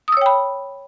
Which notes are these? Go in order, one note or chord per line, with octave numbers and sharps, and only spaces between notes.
C#5 G5 B5 D#6 E6